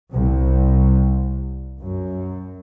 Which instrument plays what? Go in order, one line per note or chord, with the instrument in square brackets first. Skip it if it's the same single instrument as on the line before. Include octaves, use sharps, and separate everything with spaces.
[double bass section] C2
F#2